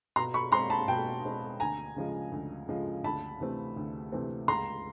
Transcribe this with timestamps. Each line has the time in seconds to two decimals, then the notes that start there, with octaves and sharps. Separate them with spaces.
0.16 B2 A#5 C6
0.34 B5 C#6
0.52 G#3 C4 A#5 C6
0.70 A5 B5
0.88 B2 G5 A5
1.24 G#3 C4
1.60 D2 G#5 A#5
1.96 C#3 F3 G#3
2.32 D2
2.69 C#3 F3 G#3
3.04 D2 A5 B5
3.40 C3 E3 A3 C4
3.76 D2
4.12 C3 E3 A3 C4
4.48 C#2 A#5 C6